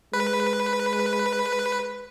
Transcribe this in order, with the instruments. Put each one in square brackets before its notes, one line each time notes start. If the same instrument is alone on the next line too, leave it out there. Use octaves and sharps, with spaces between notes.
[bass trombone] G#3 [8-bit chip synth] B4